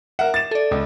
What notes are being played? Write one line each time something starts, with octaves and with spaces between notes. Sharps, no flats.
A#4 E5 F#5
A6 E7
A4 D5
C#2